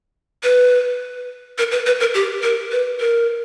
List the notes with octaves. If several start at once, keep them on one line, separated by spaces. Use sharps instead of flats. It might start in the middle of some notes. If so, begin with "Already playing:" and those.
B4
A#4
B4
B4
A#4
G4
A#4
B4
A#4